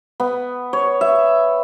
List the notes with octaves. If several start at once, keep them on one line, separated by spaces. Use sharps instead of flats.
B3
C#5
E5